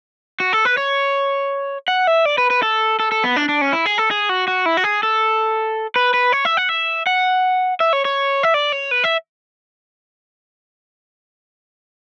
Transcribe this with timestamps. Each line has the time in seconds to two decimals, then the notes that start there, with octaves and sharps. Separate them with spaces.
0.40 F#4
0.53 A4
0.65 B4
0.77 C#5
1.88 F#5
2.07 E5
2.25 D5
2.38 B4
2.50 B4
2.63 A4
3.00 A4
3.12 A4
3.24 B3
3.36 D4
3.49 D4
3.61 C#4
3.73 E4
3.86 G#4
3.98 A4
4.11 G#4
4.29 F#4
4.48 F#4
4.66 E4
4.77 F#4
4.84 G#4
5.03 A4
5.96 B4
6.14 B4
6.32 C#5
6.45 E5
6.57 F#5
6.69 E5
7.07 F#5
7.80 E5
7.93 C#5
8.05 C#5
8.43 E5
8.54 D5
8.72 C#5
8.91 B4
9.04 E5